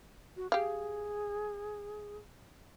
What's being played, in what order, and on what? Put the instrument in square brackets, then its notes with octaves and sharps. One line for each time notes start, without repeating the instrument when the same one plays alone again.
[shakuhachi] F#4
[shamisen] G4 F5 [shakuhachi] G#4